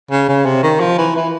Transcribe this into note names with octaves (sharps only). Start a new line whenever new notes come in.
C#3
C#3
C3
D#3
F3
E3
E3